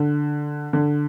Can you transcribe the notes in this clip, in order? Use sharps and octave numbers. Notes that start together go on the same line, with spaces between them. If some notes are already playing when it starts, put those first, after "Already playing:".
Already playing: D3
D3